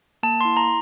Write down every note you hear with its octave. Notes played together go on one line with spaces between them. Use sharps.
A#3 A5
E4 C6
A#5